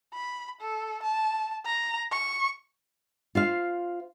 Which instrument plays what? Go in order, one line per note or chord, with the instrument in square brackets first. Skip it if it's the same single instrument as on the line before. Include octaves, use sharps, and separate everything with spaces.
[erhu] B5
A4
A5
A#5
C#6
[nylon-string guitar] F4 C5 F5